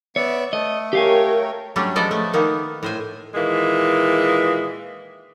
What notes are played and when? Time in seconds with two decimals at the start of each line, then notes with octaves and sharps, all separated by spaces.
0.16 B3 C#5 D5 E5
0.53 A3 D#5
0.93 G4 A#4 C#5 F5 G5 G#5
1.76 F#3 G3 A3 C#4 D4
1.96 F3 G#3 B3 A4 D5 D#5
2.11 A3
2.33 D#3 A#3 B3 D#4
2.83 A2 C5 G#5
3.34 A#2 D#3 E3 G#3 A#3